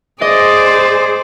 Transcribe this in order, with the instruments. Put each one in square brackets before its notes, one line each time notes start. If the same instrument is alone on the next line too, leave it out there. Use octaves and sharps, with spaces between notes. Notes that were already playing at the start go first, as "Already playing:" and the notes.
[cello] G#4 C5 [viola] D5 [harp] D#5